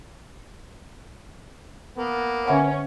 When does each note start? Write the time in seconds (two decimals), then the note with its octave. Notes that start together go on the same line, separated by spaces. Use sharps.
1.98 A#3 B3
2.48 D3 C#4 E5 F#5